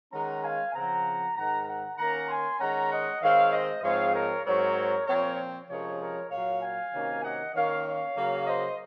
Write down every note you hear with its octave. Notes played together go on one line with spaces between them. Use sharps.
D#3 G#3 C#4 F#5 A#5
F5 G#5
C#3 F3 C4 F#5 A#5
G#2 D#3 G#3 F#5 A#5
F#5 A#5
D#3 A#3 C#4 F#5 A#5
G#5 C6
D#3 G#3 C#4 F#5 A#5
D#5 F#5
D#3 G#3 C4 C#5 F5
C5 D#5
G#2 F3 G#3 C4 C#5 F5
A#4 C#5
G#2 F#3 C4 A#4 C#5
A#2 F3 C4 A#4 C#5
C3 F3 G#3 C#4 A#4 C#5
A#4 C#5
A#2 F#3 A#3 C#5 F5
F5 G#5
C3 D#3 F#3 A#3 C#4
D#5 F#5
D#3 A#3 C#4 C#5 F5
C#5 F5
C#3 F#3 A#3
C5 D#5